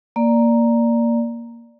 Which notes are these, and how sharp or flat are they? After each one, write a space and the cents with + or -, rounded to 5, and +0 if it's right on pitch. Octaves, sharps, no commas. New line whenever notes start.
A#3 +0 D5 +0